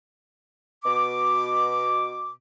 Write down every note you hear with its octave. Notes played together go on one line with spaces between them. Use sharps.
B2 D6